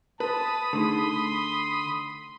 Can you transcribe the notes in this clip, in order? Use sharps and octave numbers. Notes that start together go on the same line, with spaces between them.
B4 A5 B5 C6 D#6
D3 A3 D#4 G#4 C6